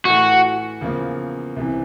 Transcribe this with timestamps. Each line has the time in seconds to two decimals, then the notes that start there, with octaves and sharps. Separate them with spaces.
0.04 A2 E3 A3 F#4
0.81 E2 C#3 F3 A#3
1.56 C2 C3 E3